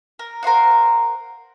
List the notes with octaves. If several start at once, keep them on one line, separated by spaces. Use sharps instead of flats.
A#4
A#4 C5 F5 F#5